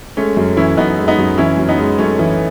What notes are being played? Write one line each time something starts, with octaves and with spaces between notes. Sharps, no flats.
G#3 A3 C#4
F#2
E3 C#4 E4
F#2 B3 D#4
G#3
B3 D#4
F#2
E3 C#4 E4
F#2
B3 D#4
G#3
F#2 A3 C#4
E3